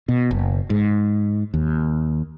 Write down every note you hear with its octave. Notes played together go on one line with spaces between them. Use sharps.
B2
F#1
G#2
D#2